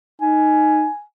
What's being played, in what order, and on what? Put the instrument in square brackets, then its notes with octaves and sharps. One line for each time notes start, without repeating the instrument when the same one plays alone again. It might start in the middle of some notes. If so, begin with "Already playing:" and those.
[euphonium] D#4 [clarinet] G#5